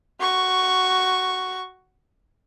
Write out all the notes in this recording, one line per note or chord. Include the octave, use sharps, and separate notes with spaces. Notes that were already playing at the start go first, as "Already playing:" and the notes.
F#4 C#6